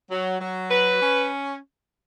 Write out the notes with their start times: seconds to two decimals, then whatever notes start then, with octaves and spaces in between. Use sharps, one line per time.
0.11 F#3
0.40 F#3
0.70 B4
1.00 C#4